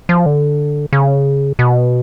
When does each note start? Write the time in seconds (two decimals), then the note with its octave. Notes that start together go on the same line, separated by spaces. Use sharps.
0.09 F3
0.26 D3
0.93 C#3
1.59 B2